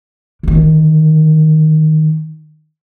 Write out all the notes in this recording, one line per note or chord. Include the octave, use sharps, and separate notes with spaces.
D3 D#3